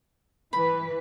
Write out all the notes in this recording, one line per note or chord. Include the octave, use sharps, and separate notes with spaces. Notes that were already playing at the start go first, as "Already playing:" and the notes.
E3 B4 B5